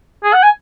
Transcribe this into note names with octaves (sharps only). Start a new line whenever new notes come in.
G#4
F#5
G#5